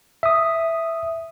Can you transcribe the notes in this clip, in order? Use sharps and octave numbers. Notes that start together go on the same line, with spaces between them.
E5 D#6